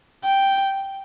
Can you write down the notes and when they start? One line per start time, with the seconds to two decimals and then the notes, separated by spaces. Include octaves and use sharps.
0.24 G5